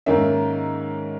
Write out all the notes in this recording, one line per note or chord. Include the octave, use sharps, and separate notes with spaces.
G#2 D#3 A#3 C#4 E5